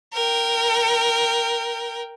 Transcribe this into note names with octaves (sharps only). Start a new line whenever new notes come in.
A#4 G5